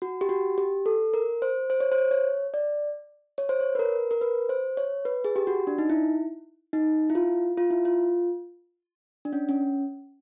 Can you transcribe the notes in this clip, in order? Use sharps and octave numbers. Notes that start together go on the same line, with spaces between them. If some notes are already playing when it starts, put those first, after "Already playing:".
F#4
G4
F#4
G4
A4
A#4
C5
C5
C#5
C5
C#5
D5
C#5
C5
C#5
B4
A#4
A#4
B4
C5
C#5
B4
G#4
G4
F#4
D4
D#4
E4
D#4
E4
F4
F4
E4
F4
D4
C#4
C#4